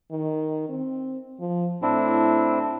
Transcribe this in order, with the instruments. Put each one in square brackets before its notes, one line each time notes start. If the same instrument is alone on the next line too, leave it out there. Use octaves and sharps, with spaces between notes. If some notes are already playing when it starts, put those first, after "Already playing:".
[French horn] D#3
C4
F3
[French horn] A2 [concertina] C4 D4 E4